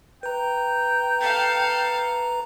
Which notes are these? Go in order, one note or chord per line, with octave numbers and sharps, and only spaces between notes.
B4 G5 A#5
A4 F5